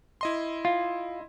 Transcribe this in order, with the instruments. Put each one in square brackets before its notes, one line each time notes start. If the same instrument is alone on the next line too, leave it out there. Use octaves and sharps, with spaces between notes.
[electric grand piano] E4 D#5 C6
[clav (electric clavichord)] F4